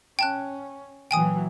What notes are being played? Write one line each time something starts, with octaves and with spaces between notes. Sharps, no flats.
C#4 G5 A5 F#6
A#2 E3 F#3 G5 G#5 D#6